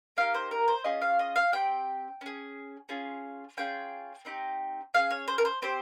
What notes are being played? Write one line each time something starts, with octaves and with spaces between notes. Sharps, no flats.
A#3 D#4 G4 F5
C5
A#4
C5
C#4 F4 G#4 D#5
F5
D#5
F5
C4 G4 G5
C#4 G#4
C#4 F4 G#4
C#4 F4 G#4 G5
C4 D#4 G4
C#4 G#4 F5
C#5
C5
A#4
C5
C4 G4 C5